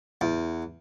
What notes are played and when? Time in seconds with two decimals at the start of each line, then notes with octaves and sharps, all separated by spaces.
0.21 E2